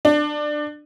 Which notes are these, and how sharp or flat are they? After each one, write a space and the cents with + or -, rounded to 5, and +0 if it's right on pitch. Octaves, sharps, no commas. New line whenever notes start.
D4 +20